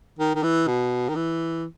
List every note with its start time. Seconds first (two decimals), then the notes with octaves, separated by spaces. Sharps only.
0.19 D#3
0.35 D#3
0.43 E3
0.67 B2
1.09 D#3
1.16 E3